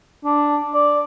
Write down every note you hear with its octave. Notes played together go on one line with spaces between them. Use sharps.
D4
D5